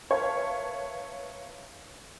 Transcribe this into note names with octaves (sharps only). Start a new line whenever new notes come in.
A#4 B4 C#5 E5 F5 A5